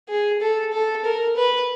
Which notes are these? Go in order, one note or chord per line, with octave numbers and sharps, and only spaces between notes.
G#4
A4
A4
A#4
B4